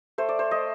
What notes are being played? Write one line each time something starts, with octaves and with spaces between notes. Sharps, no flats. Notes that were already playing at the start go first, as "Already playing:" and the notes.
A3 C5
D5
C5
A3 D#5